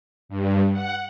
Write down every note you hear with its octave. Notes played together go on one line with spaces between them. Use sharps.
G2
F#5